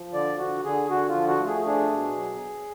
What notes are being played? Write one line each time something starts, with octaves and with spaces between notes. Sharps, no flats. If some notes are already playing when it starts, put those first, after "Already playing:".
Already playing: F3
D3 D5
D3 F#4
D3 G#4
D3 F#4
F4
F3
F#4
A3
G#4
D4 G#4
B2
F#3